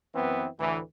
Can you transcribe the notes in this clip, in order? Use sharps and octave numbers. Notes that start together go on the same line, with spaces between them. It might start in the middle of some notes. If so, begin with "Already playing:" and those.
F#2 E3 B3 C4
D2 A2 E3